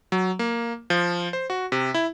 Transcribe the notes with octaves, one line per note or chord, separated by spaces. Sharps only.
F#3
A#3
F3
C5
F#4
C3
E4